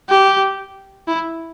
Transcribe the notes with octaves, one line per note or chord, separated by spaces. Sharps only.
G4
E4